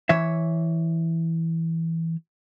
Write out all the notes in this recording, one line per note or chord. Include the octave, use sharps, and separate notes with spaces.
E3 C#5 E5